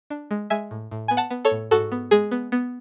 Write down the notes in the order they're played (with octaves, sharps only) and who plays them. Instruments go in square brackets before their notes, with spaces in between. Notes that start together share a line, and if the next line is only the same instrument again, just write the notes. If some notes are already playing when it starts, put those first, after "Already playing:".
[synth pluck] D4
G#3
G#3 E5 G#5
A2
A2
B3 G#5
F#5 A5
B3
A4 C#5
A2
G#2 F#4 A4
B3
G#3 G#4
B3
B3